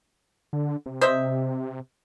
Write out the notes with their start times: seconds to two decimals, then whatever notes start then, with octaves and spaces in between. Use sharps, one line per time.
0.53 D3
0.86 C3
1.01 C5 D#5 E5